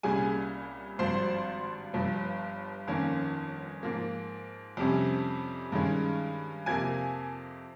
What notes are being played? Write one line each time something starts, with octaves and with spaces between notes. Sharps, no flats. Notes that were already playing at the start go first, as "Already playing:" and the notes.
C2 A#2 G3 C#4 G#4 G#5
G#1 G2 F3 C5 C6
G1 G2 F3
G1 F2 D#3 A#3 C#4
G#2 F3 A#3
F2 C3 G3 C#4
G2 D#3 G#3 C#4
F2 C3 F3 A#3 G#5 G#6